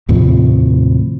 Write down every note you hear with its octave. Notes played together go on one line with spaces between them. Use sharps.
D#2 A2 C3 F3